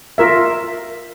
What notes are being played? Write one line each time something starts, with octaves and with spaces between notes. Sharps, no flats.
F4 A#4 E5